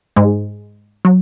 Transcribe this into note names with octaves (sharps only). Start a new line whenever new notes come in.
G#2 G#3
F#3